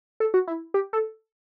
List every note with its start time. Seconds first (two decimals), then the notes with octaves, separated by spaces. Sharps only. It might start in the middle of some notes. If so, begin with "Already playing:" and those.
0.20 A4
0.34 F#4
0.47 E4
0.74 G4
0.93 A4